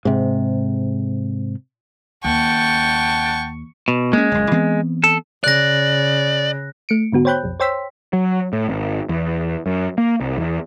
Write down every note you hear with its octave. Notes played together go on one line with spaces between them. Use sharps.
G#2 C3
D#2 F#5 G5 A5 C#6
B2
G#3 A#3 C#4
F#1 C#2
E3 B3 C4
A4
C#3 D5 F#6 A#6
A3 C#7 D7
G#2 D3 B3 F#4
C5 C#5 G5 B5 F#6 G6
B1 F2
C5 C#5 G5 C6 E6 B6
F#3
A2
G#1
E2
F#2
A#3
C2
E2